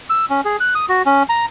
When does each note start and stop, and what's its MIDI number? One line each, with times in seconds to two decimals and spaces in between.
0.10 0.25 88
0.30 0.41 61
0.45 0.57 68
0.60 0.74 90
0.75 0.86 87
0.89 1.02 66
1.06 1.23 61
1.29 1.46 82